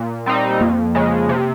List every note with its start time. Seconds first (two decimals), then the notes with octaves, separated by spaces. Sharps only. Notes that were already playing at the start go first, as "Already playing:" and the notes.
Already playing: A#2 A#3
0.26 G3 C4 D#4
0.60 F2 A#3
0.95 C#3 G#3
1.29 C3